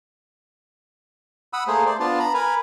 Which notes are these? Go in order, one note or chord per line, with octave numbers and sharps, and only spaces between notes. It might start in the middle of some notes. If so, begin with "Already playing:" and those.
F#5 B5 D#6 E6
A3 A#3 G#4 C5
C5 D5
B3 D4 F4 A5
A#5 B5
A#4 B4 G#5 B5